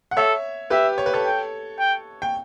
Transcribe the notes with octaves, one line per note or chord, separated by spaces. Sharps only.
F#5
A4 C#5 E5
G4 B4 E5
C#5
B4
A4 C#5
G5
G5
G5